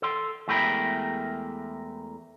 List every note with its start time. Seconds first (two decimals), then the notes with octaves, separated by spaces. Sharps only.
0.02 A4 C6
0.48 E2 G#3 A3 G4 A#4 B5